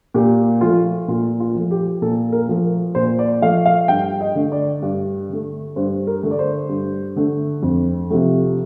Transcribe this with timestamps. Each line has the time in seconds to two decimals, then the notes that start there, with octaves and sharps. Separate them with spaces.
0.14 A#2 G4
0.61 F3 A3 F4
1.08 A#2 F4
1.40 F4
1.55 F3 A3
1.71 G4
2.02 A#2 A4
2.32 A#4
2.48 F3 A3
2.64 A#4
2.95 A#2 C5
3.19 D5
3.42 F3 A3 F5
3.66 F5
3.88 G2 G5
4.21 D#5
4.35 D3 A3
4.52 D5
4.82 G2
5.29 D3 A3
5.76 G2 C5
6.07 A#4
6.23 D3 A3
6.31 D5
6.39 C5
6.69 G2
7.16 D3 A3
7.63 F2
8.10 C3 F3 A3